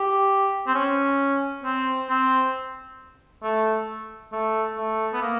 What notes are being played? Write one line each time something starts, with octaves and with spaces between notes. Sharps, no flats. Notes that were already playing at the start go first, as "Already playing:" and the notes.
Already playing: G4
C4
C#4
C4
C4
A3
A3
A3
B3
A#3